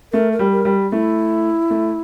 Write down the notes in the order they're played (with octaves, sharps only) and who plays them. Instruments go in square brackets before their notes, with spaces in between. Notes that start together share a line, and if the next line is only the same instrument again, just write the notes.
[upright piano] A3 [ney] A#4
[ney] A#4
[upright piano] G3
[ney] A#4
[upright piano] G3
[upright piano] A3 [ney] E4
[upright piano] A3